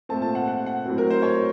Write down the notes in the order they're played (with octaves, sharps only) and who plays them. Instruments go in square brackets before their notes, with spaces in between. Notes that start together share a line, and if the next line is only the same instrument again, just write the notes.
[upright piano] A#2 A3 C4 A5
A5
F#5
F#5
F#5
A2 F#3 C4
A#4
C5
C#5